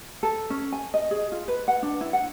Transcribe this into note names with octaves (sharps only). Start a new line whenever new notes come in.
A4
C#4
G#5
D#5
G#4
F4
B4
F#5
D4
E4
F#5